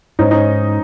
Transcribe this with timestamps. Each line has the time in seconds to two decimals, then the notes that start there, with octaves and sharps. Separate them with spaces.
0.19 G#2 C#4 D#4
0.31 C#4 D#4